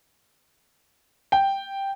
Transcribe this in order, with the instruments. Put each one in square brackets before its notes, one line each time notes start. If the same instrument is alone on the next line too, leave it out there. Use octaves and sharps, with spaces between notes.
[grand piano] G5